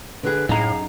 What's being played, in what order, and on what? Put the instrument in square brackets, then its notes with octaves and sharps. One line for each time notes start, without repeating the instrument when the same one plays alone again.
[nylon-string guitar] D3 G#4 [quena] B4
[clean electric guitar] F#2 A#5 [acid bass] A2 [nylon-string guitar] D#4 G#4 [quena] F5